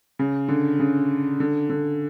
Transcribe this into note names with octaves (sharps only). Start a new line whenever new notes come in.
C#3
D3
C#3
D3
D3